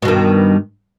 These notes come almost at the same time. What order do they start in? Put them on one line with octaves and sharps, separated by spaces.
B2 G2 D#3